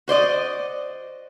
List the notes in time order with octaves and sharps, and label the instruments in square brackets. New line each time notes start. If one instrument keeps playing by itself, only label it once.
[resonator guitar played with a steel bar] F#4 C5 D5 D#5